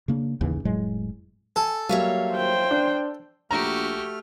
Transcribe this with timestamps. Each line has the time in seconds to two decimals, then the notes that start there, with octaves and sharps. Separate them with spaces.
0.08 C#3 A#3 D4
0.41 A1 D#2 C#3 E3
0.65 F1 A2 F#3 G#3
1.56 A4 G#5
1.89 F#3 G3 A#3 C#5 E5 F5
2.33 C5 G5
2.71 D4
3.51 A#1 A3 F#4 G4 A#5 F6